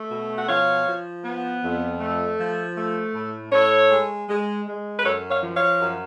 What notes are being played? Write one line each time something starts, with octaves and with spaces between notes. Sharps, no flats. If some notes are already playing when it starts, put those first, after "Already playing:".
Already playing: A3
B2
F#5
F3 C#5 F5
F3
B3
F2
A3
F3
A3
A2
A2 A4 C#5
G#3
G#3
G#3
B4
F#2 A4 C#5
C#5 F5
F3
C#5 F5
F#2